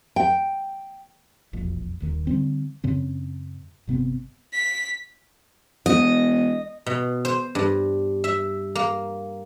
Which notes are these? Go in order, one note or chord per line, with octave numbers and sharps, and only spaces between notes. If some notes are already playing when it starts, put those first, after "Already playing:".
G5
E1 A#1 F2
D#1 D#2 D#3
D3 D#3 G3 C4
F#2 C#3 C4
G1 C3 B3 C4
B6
E1 D#5
B2
C5
G2
E5
A#3